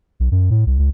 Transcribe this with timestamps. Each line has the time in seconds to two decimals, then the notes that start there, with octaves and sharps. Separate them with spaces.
0.20 B1
0.31 F#2
0.51 A2
0.66 C2
0.78 C#2